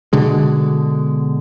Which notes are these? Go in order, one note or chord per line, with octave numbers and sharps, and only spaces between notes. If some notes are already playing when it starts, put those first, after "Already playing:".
B2 D3 G#3